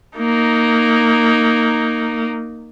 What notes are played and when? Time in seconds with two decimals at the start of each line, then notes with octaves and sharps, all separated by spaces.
0.18 A#3 D#4